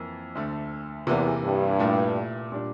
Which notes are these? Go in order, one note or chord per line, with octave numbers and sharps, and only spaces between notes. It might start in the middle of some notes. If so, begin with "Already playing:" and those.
Already playing: F2 E3 A#3
D2 D3 A3
E2 C3 E3 A#3
G2
A#2 A3 E4
A#2 G3 D4